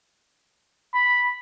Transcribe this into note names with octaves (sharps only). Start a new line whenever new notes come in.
B5